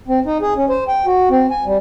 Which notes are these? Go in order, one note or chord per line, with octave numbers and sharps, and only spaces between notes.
C4
D#4
G#4
C#4
C5
G5
F#4
C4
G#5
G3